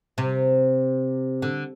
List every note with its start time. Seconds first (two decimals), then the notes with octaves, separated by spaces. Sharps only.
0.18 C3
1.42 D3